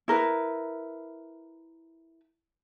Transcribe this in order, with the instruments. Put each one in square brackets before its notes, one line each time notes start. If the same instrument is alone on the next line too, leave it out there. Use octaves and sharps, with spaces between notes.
[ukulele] E4 A#4 B4